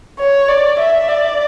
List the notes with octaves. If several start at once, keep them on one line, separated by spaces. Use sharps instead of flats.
C#5
D5
E5
D5